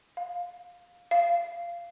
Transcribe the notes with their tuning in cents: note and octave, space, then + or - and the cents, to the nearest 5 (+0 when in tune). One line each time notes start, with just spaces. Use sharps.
F5 +20
F5 -20